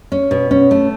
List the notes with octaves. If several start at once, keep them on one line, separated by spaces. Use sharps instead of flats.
C#4
B2
C#4
A3